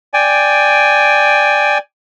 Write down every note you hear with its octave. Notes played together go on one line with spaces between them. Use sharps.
D5 G5 G#5